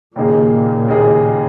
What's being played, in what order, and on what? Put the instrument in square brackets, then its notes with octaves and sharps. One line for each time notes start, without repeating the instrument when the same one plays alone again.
[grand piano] D#2 C#3 A#3 D#4 G#4 [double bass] A#2
[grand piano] D#2 C#3 A#3 D#4 G#4